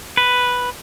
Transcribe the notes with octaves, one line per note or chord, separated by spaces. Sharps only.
B4